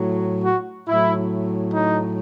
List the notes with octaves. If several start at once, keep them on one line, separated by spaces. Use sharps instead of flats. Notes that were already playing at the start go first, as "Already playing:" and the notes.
Already playing: A2 F#3
F#4
A2 F#3 E4
D#4